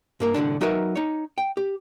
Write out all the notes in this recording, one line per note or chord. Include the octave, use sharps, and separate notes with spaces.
G2 A#3 A#4
C2 A2 D3 D4
F#3 D#4 F#4 A#4 B4 E5
D#4 C#5
G5
G4